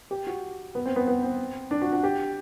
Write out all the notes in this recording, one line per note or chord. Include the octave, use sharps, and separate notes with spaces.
G4
F#4
B3
C4
B3
B3
C4
D4
F#4
F#4
G4